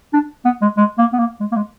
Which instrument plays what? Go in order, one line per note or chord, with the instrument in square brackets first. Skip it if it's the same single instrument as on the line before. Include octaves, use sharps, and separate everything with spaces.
[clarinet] D4
B3
G#3
G#3
A#3
B3
A#3
G#3
A#3
G#3